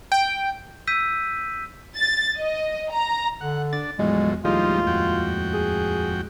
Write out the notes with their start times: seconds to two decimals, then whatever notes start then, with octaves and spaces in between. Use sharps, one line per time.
0.12 G5
0.87 E6 G6 B6 D#7
1.96 A6
2.38 D#5
2.92 A#5
3.41 D3 F#5
3.73 D4 A6
3.99 E2 A2 F3 F#3 G#3
4.45 D#2 A2 F3 G3 G#3 D#4 F4
4.87 F2 F#4 G5
5.54 G#4